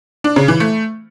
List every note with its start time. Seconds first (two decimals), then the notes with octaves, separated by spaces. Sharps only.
0.24 D4
0.36 C#3
0.48 E3
0.60 A3